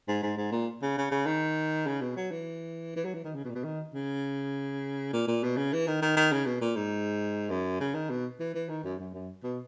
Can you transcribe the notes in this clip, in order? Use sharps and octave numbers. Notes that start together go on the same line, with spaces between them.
G#2
G#2
G#2
A#2
C#3
C#3
C#3
D#3
C#3
B2
F#3
E3
E3
F#3
E3
D#3
C#3
B2
A#2
B2
D#3
C#3
A#2
A#2
B2
C#3
E3
D#3
D#3
D#3
C#3
B2
A#2
G#2
F#2
C#3
D#3
B2
E3
E3
D#3
F#2
F#2
F#2
B2